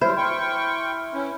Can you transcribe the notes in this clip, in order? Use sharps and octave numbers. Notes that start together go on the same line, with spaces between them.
F#3 G3 E4 C5 C6 F6
G5 C#6
C#4 E4 B4